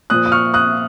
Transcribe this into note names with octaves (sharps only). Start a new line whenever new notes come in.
A#2 F3 D#6 F#6
D#6
C#6 F6
D#6 F#6